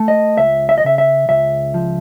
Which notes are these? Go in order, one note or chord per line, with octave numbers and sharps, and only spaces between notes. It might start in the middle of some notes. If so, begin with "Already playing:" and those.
Already playing: A3
D#5
C#2 E5
E5
D#5
C#3 E5
E5
C#2 E5
F3